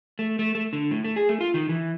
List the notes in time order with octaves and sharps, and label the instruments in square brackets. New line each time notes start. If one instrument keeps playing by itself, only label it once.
[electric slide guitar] A3
A3
A3
D3
A2
A3
G#4
A3
F4
D#3
E3